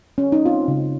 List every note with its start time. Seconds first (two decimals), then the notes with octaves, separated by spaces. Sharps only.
0.18 C#4
0.32 D#4
0.46 C4 F4
0.68 C#3